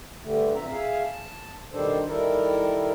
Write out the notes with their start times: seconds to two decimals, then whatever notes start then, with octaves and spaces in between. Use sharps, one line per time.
0.24 G2 D3 G3 A3
0.55 F2 A#2 C4 E5 A#5
0.70 G#4 E5 F5
1.03 A5
1.73 B2 D#3 G3 D4 A4 C5
2.08 D#3 G3 E4 A4 A#4